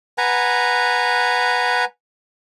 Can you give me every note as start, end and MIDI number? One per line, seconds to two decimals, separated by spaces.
0.18 1.85 71
0.18 1.85 78
0.18 1.85 80
0.18 1.85 82